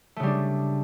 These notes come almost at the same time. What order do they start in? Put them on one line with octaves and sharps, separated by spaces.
A3 C#3 G3 D4